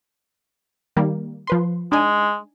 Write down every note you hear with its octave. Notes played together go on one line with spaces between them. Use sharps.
D#3 G3 A#3
F3 B4 C6
G#3 D4 D#4 G#5